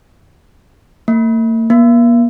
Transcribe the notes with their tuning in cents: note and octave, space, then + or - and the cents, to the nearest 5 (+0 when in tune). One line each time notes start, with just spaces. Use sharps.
A#3 -45
A#3 +40